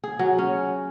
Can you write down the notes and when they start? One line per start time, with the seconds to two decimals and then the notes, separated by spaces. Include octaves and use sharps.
0.04 G#4
0.19 F#3
0.38 C#4